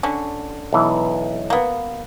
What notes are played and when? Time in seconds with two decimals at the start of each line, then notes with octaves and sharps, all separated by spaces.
0.03 D3 C#4
0.73 B1 E3
1.50 A#3 B3